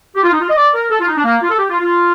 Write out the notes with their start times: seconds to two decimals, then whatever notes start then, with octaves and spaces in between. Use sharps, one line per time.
0.16 G4
0.23 F4
0.33 D#4
0.41 F4
0.49 D#5
0.57 D5
0.74 A#4
0.91 A4
1.00 F4
1.08 D#4
1.17 D4
1.24 A#3
1.42 F4
1.50 A4
1.59 G4
1.70 F4
1.81 F4